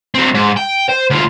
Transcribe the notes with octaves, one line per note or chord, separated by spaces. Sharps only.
F#3 C4
G#2
G5
C5
D2 F4